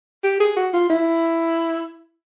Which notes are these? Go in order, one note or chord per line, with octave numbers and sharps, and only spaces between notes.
G4
G#4
F#4
F4
E4